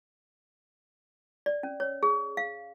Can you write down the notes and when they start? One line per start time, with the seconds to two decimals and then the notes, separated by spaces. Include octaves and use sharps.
1.46 D5
1.63 C#4
1.80 C#5
2.03 G#4
2.37 F5